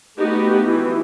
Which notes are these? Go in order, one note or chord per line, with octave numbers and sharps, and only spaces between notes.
A3 B3 D#4 F#4 G4
E3